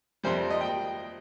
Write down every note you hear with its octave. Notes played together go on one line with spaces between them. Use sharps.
F2 C3 G3 C5
D#5
G5